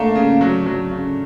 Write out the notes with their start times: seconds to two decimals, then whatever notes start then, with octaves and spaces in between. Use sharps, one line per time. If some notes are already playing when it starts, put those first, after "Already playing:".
Already playing: A3 A#3 D4
0.16 C#3
0.41 F#3
0.66 F#3
0.91 C#3